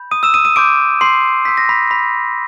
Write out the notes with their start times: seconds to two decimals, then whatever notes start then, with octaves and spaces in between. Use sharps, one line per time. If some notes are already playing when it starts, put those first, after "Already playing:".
Already playing: B5 G6
0.11 D#6 D#7
0.23 E6 E7
0.34 D#6 D#7
0.45 D#6 D#7
0.56 C6 D6 D#6 G6 D7
1.01 C6 C7
1.45 C6 E6 G6 B6
1.57 A#6
1.69 B5 B6
1.91 B5 B6